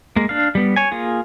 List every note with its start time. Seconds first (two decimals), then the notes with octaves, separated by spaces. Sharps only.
0.16 G#3 A#3
0.29 D4 F5
0.55 G3 B3
0.76 C#5 G#5
0.92 A#3 F4 G#4